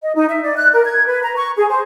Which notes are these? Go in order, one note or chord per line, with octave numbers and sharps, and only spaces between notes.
D#5
D#4
E5
D5
F#6
A#4
G#6
B4
A#5
C#6
G#4
C5